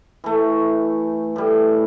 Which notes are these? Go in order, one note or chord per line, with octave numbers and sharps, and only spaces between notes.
E3 A3
A2 G3